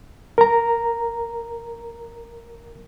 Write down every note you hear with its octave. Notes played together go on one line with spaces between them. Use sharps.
A#4 A#5